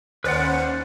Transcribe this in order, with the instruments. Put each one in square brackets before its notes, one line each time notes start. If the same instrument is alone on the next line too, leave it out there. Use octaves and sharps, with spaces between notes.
[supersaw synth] D#2 C#4 C5 [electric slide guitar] B4 D5 F#5